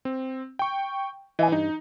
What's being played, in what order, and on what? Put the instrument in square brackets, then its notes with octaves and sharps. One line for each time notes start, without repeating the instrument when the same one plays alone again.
[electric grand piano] C4
G5 C#6
[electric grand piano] E3 [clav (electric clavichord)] D#5 E5 G#5
[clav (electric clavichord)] G2 [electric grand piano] D#4